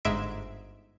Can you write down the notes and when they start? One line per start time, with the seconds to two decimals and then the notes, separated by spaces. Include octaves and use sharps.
0.05 G1 G#2 G#3 E5 B6 D7